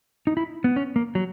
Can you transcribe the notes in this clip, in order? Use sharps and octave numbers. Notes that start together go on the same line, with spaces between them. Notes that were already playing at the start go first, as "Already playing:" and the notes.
D#4
E4
B3
C#4
A#3
F#3